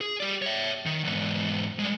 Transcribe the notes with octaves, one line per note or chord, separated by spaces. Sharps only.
G#4
G4 D5
C#5 E5
D#3
E2 G#2
G3 G#3